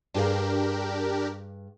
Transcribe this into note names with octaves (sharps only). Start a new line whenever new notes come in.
G2 D4 G4 G#4 A#4 F5